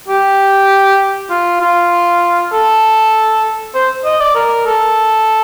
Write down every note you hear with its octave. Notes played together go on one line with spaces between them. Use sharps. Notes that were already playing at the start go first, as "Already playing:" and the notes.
G4
F4
F4
A4
C5
D#5
D5
A#4
A4